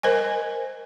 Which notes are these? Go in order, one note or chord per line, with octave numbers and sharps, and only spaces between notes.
A#4 C5 D#5 G#5